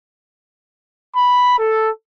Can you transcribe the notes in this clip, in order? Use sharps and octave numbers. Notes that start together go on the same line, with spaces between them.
B5
A4